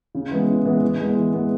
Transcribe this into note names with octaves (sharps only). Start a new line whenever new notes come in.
C#3
E3 G#3 B3
C#3
E3 G#3 B3
E3
G#3 B3
E3
G#3 B3